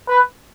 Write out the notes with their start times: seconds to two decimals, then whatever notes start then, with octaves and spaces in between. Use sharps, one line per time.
0.08 B4